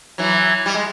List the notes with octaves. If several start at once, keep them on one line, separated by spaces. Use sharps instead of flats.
E3 F#3
G3
G#3